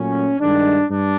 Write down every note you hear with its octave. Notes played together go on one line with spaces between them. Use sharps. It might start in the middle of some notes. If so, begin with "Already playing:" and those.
Already playing: A#2 F#3 A3 C#4
G2 D#3 G#3 D4
G2 D4